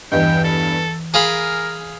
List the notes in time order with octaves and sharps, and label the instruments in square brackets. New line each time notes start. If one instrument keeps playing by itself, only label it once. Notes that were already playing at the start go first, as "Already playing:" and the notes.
[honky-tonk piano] E2 G2 [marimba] E3 D#5 [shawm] G5
[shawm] A4
[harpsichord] G#4 F5 B5 [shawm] A#4 [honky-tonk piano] G#5